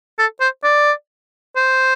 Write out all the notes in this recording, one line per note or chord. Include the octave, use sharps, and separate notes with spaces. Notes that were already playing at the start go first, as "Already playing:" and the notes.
A4
C5
D5
C5